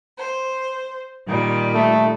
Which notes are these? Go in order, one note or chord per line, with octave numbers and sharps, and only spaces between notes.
C5
A#2 D#3 G3
A3